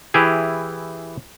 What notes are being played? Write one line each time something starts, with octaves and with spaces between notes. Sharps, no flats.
E3 E4 G4 G#4